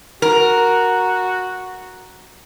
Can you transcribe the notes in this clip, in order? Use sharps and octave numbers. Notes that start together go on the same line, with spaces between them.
F#4 A#4